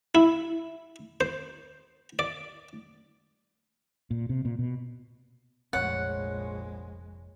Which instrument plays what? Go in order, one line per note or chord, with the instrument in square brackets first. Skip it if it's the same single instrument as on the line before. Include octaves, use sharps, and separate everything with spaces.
[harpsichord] E4
C5
D5
[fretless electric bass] A#2
C3
A#2
B2
[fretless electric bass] F1 F2 [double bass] A#1 G#3 [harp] C#5 [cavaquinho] F#5